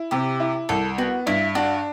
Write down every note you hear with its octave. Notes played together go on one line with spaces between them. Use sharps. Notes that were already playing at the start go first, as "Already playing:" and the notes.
Already playing: E4
C3 G4
E4
C2 A4
B3 F#4
G2 E4
D4 F#4